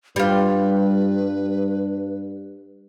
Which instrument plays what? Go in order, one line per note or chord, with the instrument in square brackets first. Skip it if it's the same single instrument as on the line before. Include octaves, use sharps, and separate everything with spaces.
[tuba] G2 [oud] G3 F4 [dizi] B4